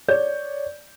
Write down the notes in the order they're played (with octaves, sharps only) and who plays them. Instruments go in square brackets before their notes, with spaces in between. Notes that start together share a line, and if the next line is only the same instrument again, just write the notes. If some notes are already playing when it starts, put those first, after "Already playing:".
[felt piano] C#5 D5 G6